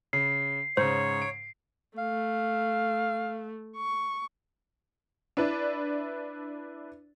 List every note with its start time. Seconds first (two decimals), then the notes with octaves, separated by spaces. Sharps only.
0.13 C#3 C7
0.77 G#2 C#3 C5 C#5
1.22 D7
1.98 A3 F5
3.77 C#6
5.37 D4 E4 B4 D5